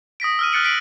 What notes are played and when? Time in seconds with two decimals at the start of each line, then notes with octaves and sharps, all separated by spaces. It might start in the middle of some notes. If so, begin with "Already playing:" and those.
0.20 D#6 A#6 B6 D7
0.39 E6 F6 D#7
0.52 F6 F#6 A6 C#7 D7 F#7
0.64 B6 D7 F#7